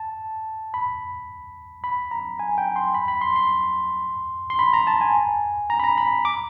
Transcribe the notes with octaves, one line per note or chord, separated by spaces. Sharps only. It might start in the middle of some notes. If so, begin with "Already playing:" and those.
Already playing: A5
B5
B5
A#5
G#5
G5
C6
B5
B5
C6
C6
C6
B5
A#5
A5
G#5
A#5
B5
A#5
B5
D6